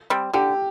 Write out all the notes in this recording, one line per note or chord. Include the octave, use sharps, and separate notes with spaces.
G3 C4
D3 G4